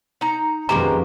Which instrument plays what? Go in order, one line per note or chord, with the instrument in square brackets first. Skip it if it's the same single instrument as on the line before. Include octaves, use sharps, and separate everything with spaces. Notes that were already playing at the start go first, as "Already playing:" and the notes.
[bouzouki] D#4 A#5
[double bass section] F2 D#3 [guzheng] B2 A#3 C#4 [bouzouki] G#3 G4 [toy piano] A#5